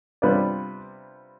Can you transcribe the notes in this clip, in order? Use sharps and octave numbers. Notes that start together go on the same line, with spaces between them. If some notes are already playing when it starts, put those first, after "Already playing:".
C3 G3 B3 D4 F4 B4 D5